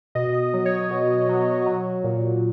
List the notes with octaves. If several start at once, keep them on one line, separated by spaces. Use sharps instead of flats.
B2 D#5
F#3
C#5
B2
F#3
F#3
A#2